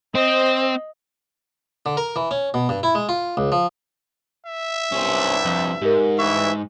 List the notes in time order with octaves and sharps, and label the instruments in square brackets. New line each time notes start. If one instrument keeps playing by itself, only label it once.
[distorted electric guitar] C4 [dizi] C5 [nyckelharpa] D#5
[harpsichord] D3
A#4
E3
C#4
B2
G2
E4
G#3
F4
C#2
F3
[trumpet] E5
[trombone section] C2 G2 [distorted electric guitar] C#4 C5
[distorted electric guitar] F2
[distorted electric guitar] G#2 [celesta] G4 A#4
[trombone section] D2 G2 E3 [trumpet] E5 [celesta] C#6